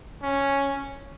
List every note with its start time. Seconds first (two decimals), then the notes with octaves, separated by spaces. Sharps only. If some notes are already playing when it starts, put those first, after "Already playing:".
0.23 C#4